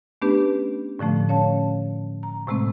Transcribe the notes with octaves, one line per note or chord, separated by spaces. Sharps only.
A3 B3 C#4 D4 G4 B4
A2 D3 F3 A3
C#4 C#5 F5 A5
A#5
A2 C3 G#3 A3 C4